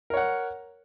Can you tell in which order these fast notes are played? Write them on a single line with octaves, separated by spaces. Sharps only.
A#4 C#5 F#5